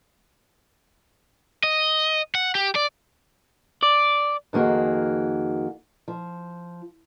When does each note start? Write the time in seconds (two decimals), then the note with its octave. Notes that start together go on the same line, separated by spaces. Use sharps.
1.64 D#5
2.35 F#5
2.55 G4
2.75 D5
3.83 D5
4.53 F2 D#3 A#3 F#4 G#4
6.08 F3